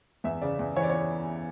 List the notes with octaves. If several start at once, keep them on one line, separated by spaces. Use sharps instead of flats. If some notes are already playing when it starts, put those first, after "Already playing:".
E2 E5
C#3 D5
E2
E3 C#5
D5
C#5